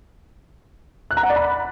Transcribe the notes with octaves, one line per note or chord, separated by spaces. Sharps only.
F#6
A#5
F#5
D5
B5